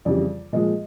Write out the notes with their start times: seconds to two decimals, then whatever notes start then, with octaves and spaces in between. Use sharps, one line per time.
0.05 F2 C#3 E3 G3 D5
0.53 A#2 F3 G#3 D#5